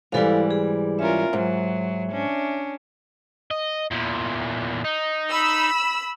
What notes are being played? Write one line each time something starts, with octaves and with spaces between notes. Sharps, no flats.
G#2 E3 G3 E4 A4 F5
G#4
C#4 F4 A#4 E5
G#2 F#3
C#4 D4
D#5
E2 A#2
D#4
B5 E6